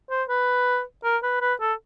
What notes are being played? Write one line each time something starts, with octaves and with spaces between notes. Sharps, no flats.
C5
B4
A#4
B4
B4
A4